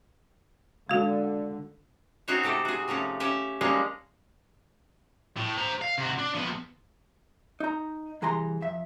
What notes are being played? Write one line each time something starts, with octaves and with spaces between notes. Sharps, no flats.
D3 G#3 F#4
C4 C#4 D#4 F#4 C5 C#5
C3 A3 G4 A4
F#4 G#4
C3 F3 A3 C#4
C#4 G4 E5
F3 G3 G#3 A#3 C#4 D#4
A2
C5 A#5
F5
C3 F#4
D4
F3 B3
D#4 A#5
C2 E3 G#4 G#5 A#5 C6
F2 E5